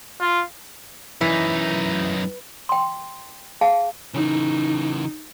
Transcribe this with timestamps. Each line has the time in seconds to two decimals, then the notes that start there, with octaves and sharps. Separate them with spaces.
0.21 F4
1.21 F#2 E3 D#4
2.69 G5 C6
3.61 G#4 F5 A5
4.14 C#3 E3 D#4